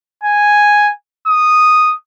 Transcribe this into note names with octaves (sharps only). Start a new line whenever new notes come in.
G#5
D#6